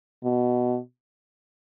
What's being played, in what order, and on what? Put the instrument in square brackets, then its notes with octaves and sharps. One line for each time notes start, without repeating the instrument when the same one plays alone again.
[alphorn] B2